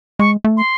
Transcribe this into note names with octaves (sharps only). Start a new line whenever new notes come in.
G#3 C#6
A3
C6